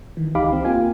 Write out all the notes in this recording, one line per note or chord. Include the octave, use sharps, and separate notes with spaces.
D#3 E3
C#2 D#4 G4 F5 B5 D6
C4
A#3 F4 G4 F5 G#5